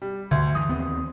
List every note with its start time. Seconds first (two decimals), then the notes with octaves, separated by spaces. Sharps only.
0.02 G3
0.31 D2 D3
0.55 G2 E3 D#6
0.69 D#2 B3 C4